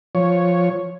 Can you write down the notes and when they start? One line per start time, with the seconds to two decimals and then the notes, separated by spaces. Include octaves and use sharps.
0.15 F3 C#5